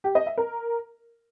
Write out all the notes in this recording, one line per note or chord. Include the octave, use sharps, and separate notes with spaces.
G4
D#5
E5
A#4